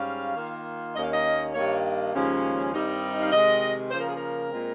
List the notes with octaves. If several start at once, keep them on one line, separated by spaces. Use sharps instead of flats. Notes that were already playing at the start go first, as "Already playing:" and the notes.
Already playing: G#2 G3 C#4 F5
D#3 A#3 F4
D#2 D#3 A#3 C#4 D#5
F5
D#5
G2 D#3 A#3 C#5
D#2 C#3 F3 G#3 C#4
G2 D#3 G3 C4 D#4
F5
C3 D#3 G#3 D#5
C#3 F3 A#3 C5
A#4
G#4
A#4
A#2 G#3 C4